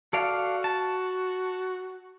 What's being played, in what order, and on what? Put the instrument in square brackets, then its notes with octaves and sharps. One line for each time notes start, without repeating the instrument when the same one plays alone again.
[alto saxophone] F#4 [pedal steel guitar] A4 D5 F5
[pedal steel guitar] A5